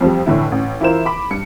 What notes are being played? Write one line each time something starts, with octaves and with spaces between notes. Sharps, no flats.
F2 F3 G3
F1 A2 D3 E4
A1
E3 E4 F4 A#4 C5 E7
B5 D6
G2 C#7